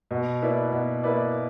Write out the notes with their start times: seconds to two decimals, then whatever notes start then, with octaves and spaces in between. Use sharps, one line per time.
0.11 B2
0.42 A#3 E4 B4 D5
0.72 B2
1.03 A#3 E4 B4 D5